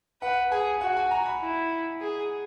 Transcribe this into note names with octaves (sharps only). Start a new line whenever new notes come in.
B4 F#5
G#4 G#5
F#4 F#5
G#5
A#5
B5
E4
G#4